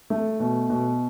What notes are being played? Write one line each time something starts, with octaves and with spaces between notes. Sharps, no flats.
A3
B2
B2